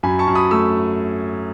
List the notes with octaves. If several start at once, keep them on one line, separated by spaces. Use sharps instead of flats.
F#2 G#5 B5
A5 C#6
F#2
B5 D#6
A3 C#6 E6